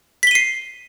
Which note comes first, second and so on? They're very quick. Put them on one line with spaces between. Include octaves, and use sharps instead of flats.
B6 G7 D#7 C7